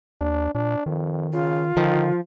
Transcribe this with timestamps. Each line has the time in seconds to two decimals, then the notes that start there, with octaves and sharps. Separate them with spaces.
0.21 D#2 D4
0.55 A#2 D4
0.86 F2 D#3
1.33 C#3 F4
1.77 D3 D#3 F3